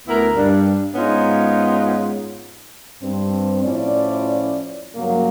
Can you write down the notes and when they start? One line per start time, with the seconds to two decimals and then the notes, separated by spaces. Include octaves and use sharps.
0.07 D2 B3 E4 A#4
0.36 G2 D4
0.95 G#2 B3 C#4 D#4 F4
3.01 G2 C4
3.63 A2 F3 C#4 E4 D5
4.95 G2 C#3 F#3 A#3